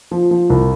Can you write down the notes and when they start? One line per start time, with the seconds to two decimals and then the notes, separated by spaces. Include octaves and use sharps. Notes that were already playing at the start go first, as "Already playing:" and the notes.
0.11 F3
0.31 F3
0.50 C2